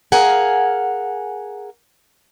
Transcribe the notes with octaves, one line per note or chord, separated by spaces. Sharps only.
G#4 A#4 F5 F#5 G#5